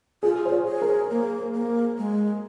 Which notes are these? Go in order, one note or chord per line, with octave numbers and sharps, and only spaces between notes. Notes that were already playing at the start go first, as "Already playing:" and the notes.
F4 G#4
C5
C#5
G#4
A#4
A#3
A#3
G#3